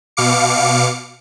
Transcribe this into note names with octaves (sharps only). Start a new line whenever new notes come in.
B2 F5 D6 C#7